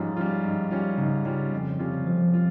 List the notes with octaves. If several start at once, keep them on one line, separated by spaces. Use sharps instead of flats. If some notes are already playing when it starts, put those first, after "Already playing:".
Already playing: G#2 F3 G3 C#4 F4
G3 C#4 F4
G#2
G3 C#4 F4
G#2 C#3
G3 C#4 F4
F2
C3 G3 C#4 F4
F2 F3
F4